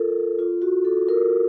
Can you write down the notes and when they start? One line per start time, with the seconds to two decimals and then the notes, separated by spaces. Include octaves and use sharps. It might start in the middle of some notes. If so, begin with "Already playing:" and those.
Already playing: F4 A4 A#4
0.39 F4
0.62 F#4
0.85 A4
1.08 A#4